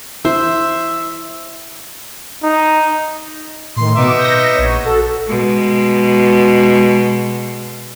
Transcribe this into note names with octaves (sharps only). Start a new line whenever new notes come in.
E4 C5 E5
D#4
A2 D#3 C6
B2 B3 D#4 E5 D6
G6 A#6
A#1 C#5
F#4 A4
B2 G#3